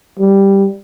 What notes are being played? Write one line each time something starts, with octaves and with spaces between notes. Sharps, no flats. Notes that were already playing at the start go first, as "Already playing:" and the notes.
G3